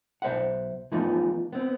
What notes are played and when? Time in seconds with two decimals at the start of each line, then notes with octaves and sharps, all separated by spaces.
0.22 B1 C5 E5 F#5
0.92 E3 F3 A3 B3 D#4 F4
1.53 B3 C4